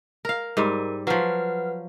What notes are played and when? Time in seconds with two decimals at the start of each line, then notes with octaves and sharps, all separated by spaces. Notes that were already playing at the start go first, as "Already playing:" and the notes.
0.25 A#4 F5
0.57 G#2 G3 A#4
1.07 F3 F#3 B4 F#5 F6